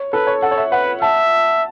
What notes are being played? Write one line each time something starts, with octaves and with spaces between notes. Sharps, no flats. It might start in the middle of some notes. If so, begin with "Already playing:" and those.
Already playing: C#5
A4 B4
C#5
A4 F#5
C#5
E5
B4 F#5
E5 A5